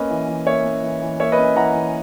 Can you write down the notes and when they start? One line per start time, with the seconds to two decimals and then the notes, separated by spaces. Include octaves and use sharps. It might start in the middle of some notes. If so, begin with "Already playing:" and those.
Already playing: A#3 C#4 B4 D#5
0.10 E3
0.28 E3
0.46 A#3 C#5 E5
0.65 C#4
0.83 E3
1.01 E3
1.20 A#3 C#5 E5
1.32 B4 D#5
1.38 C#4
1.56 E3 F#5 A#5
1.75 E3